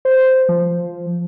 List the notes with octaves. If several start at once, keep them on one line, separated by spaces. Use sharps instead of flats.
C5
F3